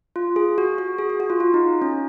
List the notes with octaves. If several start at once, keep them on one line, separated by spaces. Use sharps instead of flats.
F4
G#4
F#4
F#4
G#4
F#4
F#4
F4
F4
D#4
C#4